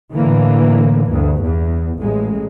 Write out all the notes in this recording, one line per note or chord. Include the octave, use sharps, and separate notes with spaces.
A2 D3 E3 A#3
D2 G2
E2
A1 G#3